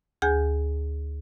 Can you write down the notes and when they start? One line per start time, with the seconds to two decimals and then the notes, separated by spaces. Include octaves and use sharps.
0.22 D2 G#4 G#5 G6